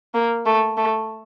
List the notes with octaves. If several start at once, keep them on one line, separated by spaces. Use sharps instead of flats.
A#3
A3
A3